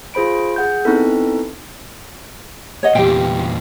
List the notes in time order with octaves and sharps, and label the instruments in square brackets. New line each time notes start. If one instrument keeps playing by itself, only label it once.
[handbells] F4 G#4 C5 B5 D7
G#4 F#5 G6
B3 C4 D#4 E4 A4
[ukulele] C#5 D#5 F#5
[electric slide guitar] E2 A#2 [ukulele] G4 G5